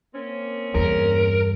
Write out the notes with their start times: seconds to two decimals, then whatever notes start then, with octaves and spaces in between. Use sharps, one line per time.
0.15 A#3 C4 C#4
0.75 E2 G2 A#4